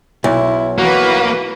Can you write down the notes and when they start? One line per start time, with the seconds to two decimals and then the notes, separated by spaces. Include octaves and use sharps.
0.24 B1 E4
0.78 E3 A#3 F#4 B4